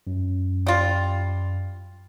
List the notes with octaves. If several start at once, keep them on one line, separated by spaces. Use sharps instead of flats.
F#2
G3 F4